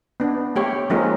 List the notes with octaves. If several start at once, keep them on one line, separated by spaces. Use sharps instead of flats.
B3 D4
A3 G4 C#5
F3 G#3 A#3 C#4 D#4